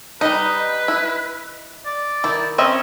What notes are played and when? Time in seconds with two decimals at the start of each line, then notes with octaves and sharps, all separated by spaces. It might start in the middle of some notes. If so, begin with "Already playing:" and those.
0.21 G3 D#4 B4 D#5
0.88 E4
1.86 D5
2.24 D#3 E4
2.58 C4 C#4 D#5 E5